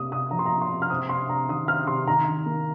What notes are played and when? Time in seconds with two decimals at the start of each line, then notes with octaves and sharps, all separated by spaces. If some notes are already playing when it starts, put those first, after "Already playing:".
Already playing: C3 A#3 D#6
0.12 C3 D#6
0.31 F3 A#5
0.39 C6
0.46 A#5
0.51 A#3
0.61 C6
0.70 C3
0.82 F6
0.90 C4 D#6
1.09 C3 C6
1.29 C3 A#5
1.49 D#3 D#6
1.68 C4 F6
1.87 C3 C6
2.07 D#3 A#5
2.27 D#3
2.46 A#3